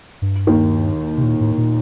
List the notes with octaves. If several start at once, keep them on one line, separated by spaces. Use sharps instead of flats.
G2
D#2 D#3
C3
A#2
A2
A#2